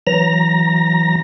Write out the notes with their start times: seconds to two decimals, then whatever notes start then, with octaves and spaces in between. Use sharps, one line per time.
0.07 E3 F#3 A#5 A#6